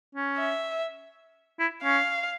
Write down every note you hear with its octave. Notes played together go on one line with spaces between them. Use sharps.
C#4
E5
E4
C#4 F5